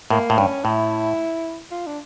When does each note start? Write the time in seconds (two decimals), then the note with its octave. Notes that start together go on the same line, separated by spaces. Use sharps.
0.10 A2 A#3
0.30 A2
0.38 G2 C#4
0.64 A2 E4
1.71 F4
1.86 D4